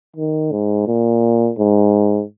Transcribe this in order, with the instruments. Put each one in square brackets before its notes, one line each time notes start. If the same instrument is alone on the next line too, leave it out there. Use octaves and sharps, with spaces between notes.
[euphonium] D#3
G#2
A#2
G#2